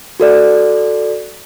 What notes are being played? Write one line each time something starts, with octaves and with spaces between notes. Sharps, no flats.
F#4 A4 D5